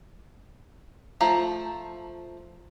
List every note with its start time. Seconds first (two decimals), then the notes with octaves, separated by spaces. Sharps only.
1.21 F3 A3 A#5